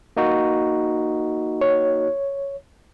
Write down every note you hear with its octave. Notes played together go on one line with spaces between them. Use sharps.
A#3 D#4 F#4
C#5